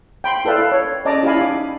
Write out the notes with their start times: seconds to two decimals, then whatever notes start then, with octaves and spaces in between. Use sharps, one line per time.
0.24 G5 B5 C6
0.45 E4 A4 B4 D5 F5
0.71 C#5
1.05 C#4 D5 D#5 A5 A#5 D6
1.23 E4 G4 D5 F5 G#5 B5
1.41 D#4 B5 D6